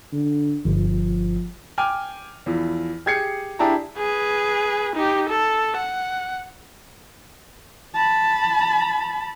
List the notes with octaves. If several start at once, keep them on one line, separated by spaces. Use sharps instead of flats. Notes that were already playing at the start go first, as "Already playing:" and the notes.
D3
G1 F3
G5 G#5 D6 F6
E2 E3 F3
G4 G#4 G#6 C7 C#7
D4 E4 G4 G#4 A5 A#5
G#4 B4
D#4 G4
A4
F#5
A5 B5